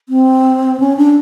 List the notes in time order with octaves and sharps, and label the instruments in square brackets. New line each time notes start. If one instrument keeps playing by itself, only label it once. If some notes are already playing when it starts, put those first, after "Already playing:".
[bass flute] C4
C#4
D4